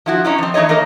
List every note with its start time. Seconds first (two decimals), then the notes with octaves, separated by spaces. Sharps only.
0.06 F3 E4 F#4
0.25 G3 C#4 D#4 E4
0.38 F3 C4
0.54 E3 A3 D#4 C#5 D#5
0.69 E3 A#3 D#4 A#4